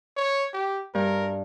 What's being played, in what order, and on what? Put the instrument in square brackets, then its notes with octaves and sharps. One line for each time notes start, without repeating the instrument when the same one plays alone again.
[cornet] C#5
G4
[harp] G2 [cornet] A#4